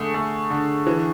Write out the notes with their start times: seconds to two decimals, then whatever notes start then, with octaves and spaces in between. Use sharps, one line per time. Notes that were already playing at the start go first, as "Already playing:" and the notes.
Already playing: D3 A3 G#4
0.14 A3
0.50 D3
0.87 E3